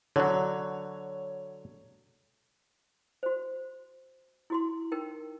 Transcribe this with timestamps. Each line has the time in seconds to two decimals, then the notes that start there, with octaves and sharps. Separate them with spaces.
0.16 D3 F#3 C#5
3.23 F#4 C5
4.50 E4 F#4 C6
4.92 D#4 A#4 G5